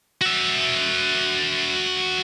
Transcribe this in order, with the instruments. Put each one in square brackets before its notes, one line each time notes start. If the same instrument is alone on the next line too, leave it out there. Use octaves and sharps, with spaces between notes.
[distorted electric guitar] F#4 E5